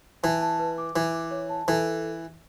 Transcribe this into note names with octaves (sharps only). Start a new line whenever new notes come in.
E3 A5
A5
B4
D6
E3 D6
D6
C#5
A5
E3 A4